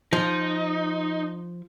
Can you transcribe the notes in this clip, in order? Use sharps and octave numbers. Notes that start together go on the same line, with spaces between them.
F3 D#4